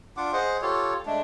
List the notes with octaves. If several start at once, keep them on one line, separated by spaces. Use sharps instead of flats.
D4 F4 F#5 D6
G#4 C5 D#5 F#5
F4 G4 A4 C#5
G#3 A3 D4